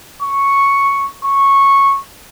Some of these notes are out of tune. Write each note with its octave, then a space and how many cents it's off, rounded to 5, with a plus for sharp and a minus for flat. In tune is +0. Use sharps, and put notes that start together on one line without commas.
C#6 +0
C#6 -10